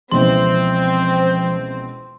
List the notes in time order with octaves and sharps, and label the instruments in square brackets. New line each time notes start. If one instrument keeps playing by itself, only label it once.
[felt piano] C#2 B2 E3 [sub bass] F3 [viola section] C4 [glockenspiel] C6